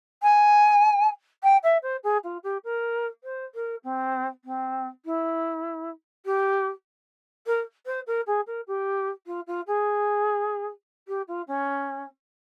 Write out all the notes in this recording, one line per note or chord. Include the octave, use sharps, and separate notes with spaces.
G#5
G5
E5
C5
G#4
F4
G4
A#4
C5
A#4
C4
C4
E4
G4
A#4
C5
A#4
G#4
A#4
G4
F4
F4
G#4
G4
F4
C#4